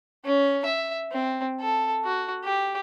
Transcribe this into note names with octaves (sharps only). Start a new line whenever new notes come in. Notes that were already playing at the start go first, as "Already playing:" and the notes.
C#4
E5
C4
A4
F#4
G4